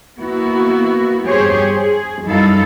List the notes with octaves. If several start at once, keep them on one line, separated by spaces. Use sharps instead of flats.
A#3 B3 E4 F#4
G2 G4 G#4 C5 C#5
G#4
F#2 G3 D#4 E4 A4 F5